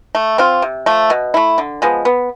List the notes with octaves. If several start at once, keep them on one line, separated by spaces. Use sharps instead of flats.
A3
C4 F4
C3
F3 A3
B2
A3 E4
D3
F3 G#3 B3
B3